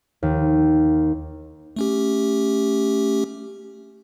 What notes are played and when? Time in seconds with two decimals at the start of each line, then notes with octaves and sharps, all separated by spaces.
0.23 D#2
1.76 A3 C#4 G4